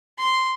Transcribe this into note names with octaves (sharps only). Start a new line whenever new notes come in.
C6